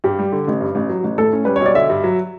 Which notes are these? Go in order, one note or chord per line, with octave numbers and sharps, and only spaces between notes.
G2 G4
G3
D3
A1
G2
A1
F#3
A1
A2 A4
C#4
G3 B4
B1 C#5
D5
D3 E5
G2
F#3